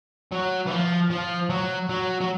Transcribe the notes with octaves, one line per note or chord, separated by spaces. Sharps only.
F#3
E3
F3
F3
F#3
F#3
F#3